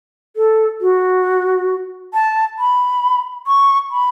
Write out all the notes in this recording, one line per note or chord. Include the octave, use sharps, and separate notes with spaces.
A4
F#4
A5
B5
C#6
B5